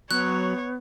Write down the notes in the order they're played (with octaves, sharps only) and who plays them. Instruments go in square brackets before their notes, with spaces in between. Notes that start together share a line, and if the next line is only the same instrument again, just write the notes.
[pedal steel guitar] F#3 [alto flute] B3 [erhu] C#5 [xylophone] F#6